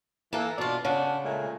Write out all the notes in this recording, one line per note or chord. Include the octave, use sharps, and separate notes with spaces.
E3 A#3 A4
B2 D4 F4 F#4 D5
C#3 D4 F#5
A#2 G#3 A3